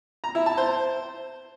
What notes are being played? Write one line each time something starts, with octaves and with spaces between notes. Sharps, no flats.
A#5
E4
A5
C5